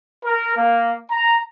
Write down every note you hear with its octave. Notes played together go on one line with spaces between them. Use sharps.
A#4
A#3
A#5